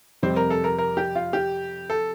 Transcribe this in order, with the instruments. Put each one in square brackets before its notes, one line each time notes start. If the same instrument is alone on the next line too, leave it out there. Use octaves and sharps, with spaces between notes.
[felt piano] F2 C3 G3 [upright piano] C4
[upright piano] A#4
A4
A#4
A#4
G4
F4
G4
A4